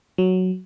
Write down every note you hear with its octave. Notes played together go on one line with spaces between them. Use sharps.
F#3